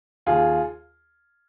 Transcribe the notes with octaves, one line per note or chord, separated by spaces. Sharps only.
D#2 F4 G#4